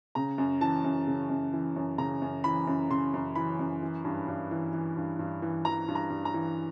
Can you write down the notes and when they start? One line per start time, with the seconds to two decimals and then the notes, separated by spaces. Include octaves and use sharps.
0.15 C#3 A#5
0.38 F#2
0.61 E3 A5
0.84 F#2
1.07 C#3
1.29 F#2
1.53 E3
1.76 F#2
1.98 C#3 A#5
2.22 F#2
2.44 E3 B5
2.67 F#2
2.90 C#3 C6
3.14 F#2
3.35 E3 B5
3.59 F#2
3.82 E3
4.05 G2
4.28 G2
4.51 E3
4.73 E3
4.97 G2
5.19 G2
5.42 E3
5.65 E3 A#5
5.88 G2
5.95 A#5
6.10 G2
6.25 A#5
6.34 E3